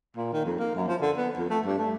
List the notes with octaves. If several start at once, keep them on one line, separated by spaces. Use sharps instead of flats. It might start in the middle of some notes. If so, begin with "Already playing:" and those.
A#2
D#3
F2
A#3
F#2
F3
D3
B3
F2
A3
G2
A3